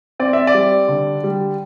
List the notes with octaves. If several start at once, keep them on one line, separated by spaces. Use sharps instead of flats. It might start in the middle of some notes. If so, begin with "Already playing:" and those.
C4 D5
E5
D5
G3
D3
G3